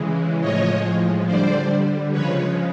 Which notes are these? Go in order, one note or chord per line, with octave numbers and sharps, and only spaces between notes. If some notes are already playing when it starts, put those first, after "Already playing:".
Already playing: C#3 E3 G#3
A2 F3 G#3 C#5 D#5
D3 G3 C5 D5
C#3 F3 G#3 B4 C#5